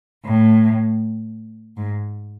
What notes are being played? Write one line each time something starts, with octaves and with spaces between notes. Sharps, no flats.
A2
G#2